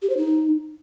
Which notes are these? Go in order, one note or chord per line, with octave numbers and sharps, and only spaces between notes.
G4
C5
D#4